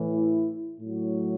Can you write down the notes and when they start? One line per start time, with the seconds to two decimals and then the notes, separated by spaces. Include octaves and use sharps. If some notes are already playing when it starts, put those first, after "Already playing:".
Already playing: A2 E3
0.10 E4
0.79 A2 F#3